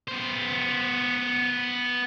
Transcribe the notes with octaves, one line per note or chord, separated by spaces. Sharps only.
B3 C5